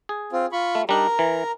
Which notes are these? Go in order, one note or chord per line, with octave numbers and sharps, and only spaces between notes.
G#4
C4 F4
F4 B5 C#6
A3
G3 D4 D#4 A#4 A#5
E3